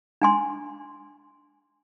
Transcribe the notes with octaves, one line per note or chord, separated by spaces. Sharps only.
D4 G#5 C6